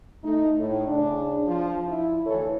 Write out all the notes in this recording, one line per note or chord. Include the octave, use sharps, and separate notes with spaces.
A3 D#4
A2
C#3 D4
F3
E4
D2 E3 A4 C#5